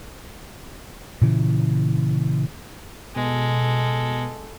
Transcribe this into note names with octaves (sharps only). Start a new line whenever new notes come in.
A#2 C#3 E3
B2 G#3 A4